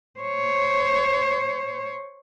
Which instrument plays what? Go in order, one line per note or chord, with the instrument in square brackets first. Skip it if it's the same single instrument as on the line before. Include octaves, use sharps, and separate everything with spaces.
[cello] C5 C#5